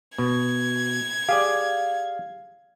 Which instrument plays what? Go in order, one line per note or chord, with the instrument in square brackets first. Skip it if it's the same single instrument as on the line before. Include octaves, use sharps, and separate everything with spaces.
[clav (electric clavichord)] B2 [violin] G#6
[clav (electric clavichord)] G4 G#4 D5 [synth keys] F5